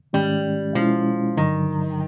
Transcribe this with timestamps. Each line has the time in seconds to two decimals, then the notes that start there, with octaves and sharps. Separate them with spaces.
0.13 G#2 D#3 G3 G#3 C#4
0.75 B2 F3 G#3 C#4 E4
1.37 G2 D3 D#3 F#3